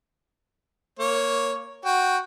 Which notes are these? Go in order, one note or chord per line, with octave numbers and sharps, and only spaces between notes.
A#3 C#5
F#4 G5